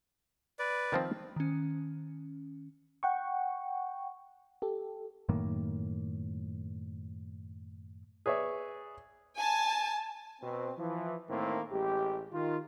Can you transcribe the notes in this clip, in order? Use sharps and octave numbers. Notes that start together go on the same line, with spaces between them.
B4 D5
D#3 F3 C4
D#3 C#4
F#5 G5 C#6
G4 A4
F#2 A2 D#3 A#3
G#4 B4 C#5 D5 E5
G#5 A5
B2 C4
E3 F3
A2 D#3 A3 A#3 C4
A1 G#3 G4
D#3 F4